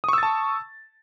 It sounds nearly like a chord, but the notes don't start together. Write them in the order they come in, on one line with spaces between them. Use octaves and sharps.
D#6 C#6 E6 A6 A5